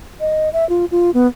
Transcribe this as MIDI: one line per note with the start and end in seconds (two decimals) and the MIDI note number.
0.20 0.49 75
0.53 0.67 76
0.69 0.85 65
0.91 1.11 65
1.14 1.27 59